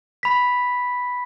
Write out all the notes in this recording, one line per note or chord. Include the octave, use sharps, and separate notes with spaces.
B5 B6